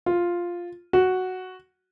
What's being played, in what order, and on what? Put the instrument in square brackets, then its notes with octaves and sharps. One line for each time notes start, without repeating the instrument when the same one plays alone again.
[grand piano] F4
F#4